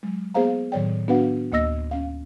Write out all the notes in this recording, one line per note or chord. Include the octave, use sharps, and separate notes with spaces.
F#3 G#3
A#3 B3 G#4 C5 F5 A#5
A2 D#3 F#3 C#5 D5 G5
B3 D4 F#4 B4 F5 F#5
D2 A#3 D#5 E6 A#6
C#4 F5